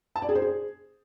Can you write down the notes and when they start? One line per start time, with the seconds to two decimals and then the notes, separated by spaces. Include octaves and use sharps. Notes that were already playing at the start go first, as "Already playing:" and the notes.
0.16 A5
0.22 D5
0.29 G#4
0.35 C5
0.42 G#4